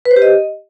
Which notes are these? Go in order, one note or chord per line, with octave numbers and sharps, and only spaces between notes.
B4
C5
G4
D#5